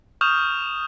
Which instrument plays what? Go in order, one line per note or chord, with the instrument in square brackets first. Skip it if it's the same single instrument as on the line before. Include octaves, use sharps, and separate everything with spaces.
[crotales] C#6 D#6 F6 G6 E7 F7